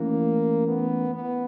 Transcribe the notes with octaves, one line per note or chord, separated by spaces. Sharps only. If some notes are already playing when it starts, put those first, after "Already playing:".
Already playing: E3 A3 A#3 C#4 E4
B3
B3